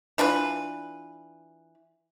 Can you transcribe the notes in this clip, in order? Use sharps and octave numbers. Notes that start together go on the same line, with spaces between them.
E3 D4 F4 B4